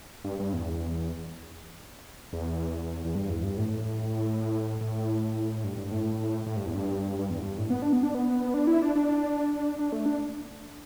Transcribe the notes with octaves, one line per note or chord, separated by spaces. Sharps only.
G2
G2
E2
E2
E2
G2
E2
G2
A2
A2
G2
G2
A2
A2
G2
E2
G2
G2
E2
G2
A2
B3
D4
B3
D4
B3
D4
E4
D4
D4
D4
A3
D4